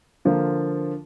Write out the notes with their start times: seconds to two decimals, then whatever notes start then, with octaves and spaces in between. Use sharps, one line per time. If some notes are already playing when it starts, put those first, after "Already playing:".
0.25 D3 F3 A#3 F4